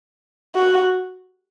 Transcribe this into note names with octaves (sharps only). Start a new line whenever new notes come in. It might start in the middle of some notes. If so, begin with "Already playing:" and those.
F#4